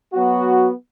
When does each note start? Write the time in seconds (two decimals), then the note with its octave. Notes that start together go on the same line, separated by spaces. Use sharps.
0.13 F#3 B3 F#4